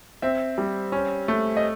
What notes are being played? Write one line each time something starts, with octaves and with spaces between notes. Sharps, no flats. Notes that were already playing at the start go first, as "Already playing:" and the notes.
C4 E5
G3
C#4
A3
D#5